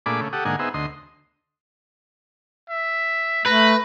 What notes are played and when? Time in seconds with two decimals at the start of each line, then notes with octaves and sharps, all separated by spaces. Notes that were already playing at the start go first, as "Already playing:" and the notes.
0.06 A#2 A3 D4 G#4 B5 D6
0.20 C#3 A3
0.33 G4 A4 F#5 D#6
0.45 G#2 D3 A#3 D#5 F#5 G#5
0.59 B3 D#4 G#4 C5 E5
0.74 D2 D#5 C6
2.70 E5
3.46 A3 B4 A#5